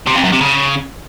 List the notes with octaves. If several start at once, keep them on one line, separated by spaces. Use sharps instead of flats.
C3
F2
F#2
C3
C#3